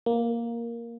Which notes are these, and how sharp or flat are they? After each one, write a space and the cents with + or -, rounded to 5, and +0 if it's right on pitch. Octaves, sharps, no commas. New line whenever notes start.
A#3 +5